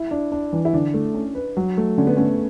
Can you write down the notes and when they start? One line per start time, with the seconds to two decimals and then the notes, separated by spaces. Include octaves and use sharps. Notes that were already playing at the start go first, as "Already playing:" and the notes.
Already playing: E4
0.11 D4
0.32 D4
0.53 E3
0.65 E4
0.73 D3 D4
0.94 A3
1.15 C#4
1.35 B4
1.57 F#3
1.77 A3
1.98 D3 C#4
2.07 B3
2.17 A3 C#4